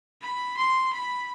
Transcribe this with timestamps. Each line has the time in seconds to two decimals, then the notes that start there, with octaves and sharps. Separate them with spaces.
0.22 B5
0.57 C6
0.93 B5